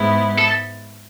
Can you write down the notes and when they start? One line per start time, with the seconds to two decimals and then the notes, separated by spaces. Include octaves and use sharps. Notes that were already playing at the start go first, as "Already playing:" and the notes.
Already playing: G#2 G#3 B3 E4
0.38 A4